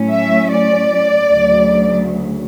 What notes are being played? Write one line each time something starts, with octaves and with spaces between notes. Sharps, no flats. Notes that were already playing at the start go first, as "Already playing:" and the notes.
Already playing: A2 F#3 C#4
E5
D5
D2 C#3 F#3